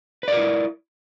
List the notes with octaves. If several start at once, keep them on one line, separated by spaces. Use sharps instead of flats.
E4 A#4 B4 D5